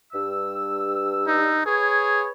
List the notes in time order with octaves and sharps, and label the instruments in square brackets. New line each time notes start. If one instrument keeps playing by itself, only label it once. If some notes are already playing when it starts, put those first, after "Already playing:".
[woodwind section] G2 E6
[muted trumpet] D#4
[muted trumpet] G#4 [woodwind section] B4 C#5